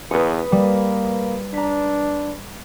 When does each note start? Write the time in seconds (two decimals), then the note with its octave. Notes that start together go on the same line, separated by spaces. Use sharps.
0.11 E2 B4 D#6 C#7
0.52 G3 A#3
1.54 D4 A#5 B6